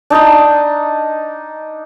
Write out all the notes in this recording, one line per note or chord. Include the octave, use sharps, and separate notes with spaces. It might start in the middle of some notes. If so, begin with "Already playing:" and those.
D4 D#4 D5 D#5